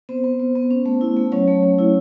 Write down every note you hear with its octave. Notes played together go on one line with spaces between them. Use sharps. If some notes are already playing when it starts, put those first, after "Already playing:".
B3 C4 C5
B3
B3
B3
C#4
A3
E4
A3
F#3 C#4 C#5
A3
A3
E4